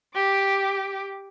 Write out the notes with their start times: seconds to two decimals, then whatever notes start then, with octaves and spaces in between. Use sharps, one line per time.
0.14 G4 D6